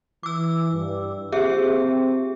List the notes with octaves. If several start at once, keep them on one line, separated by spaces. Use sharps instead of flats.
E3 D6 E6
G2
F3 A#3 C4 G4 G#4 E5